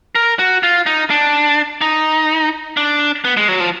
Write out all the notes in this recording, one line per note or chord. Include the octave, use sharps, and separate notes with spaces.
A#4
F#4
F4
D#4
D4
D#4
D4
B3
G#3
F#3
F3